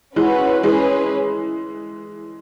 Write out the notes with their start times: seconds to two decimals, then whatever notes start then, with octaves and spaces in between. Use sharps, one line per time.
0.16 E3 G#3 C#4 F#4 B4
0.63 E3 G#3 C#4 G#4 B4